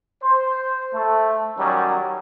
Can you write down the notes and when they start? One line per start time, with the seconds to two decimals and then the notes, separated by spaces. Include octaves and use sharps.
0.23 C5
0.94 A3 A4
1.59 D#3 F#3 G3 C#4